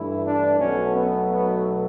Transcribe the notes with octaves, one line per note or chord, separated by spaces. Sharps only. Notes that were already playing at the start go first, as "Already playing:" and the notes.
Already playing: G2 E3 A3 E4
D4
B1 B2 F#3 A3 C#4
B3
B3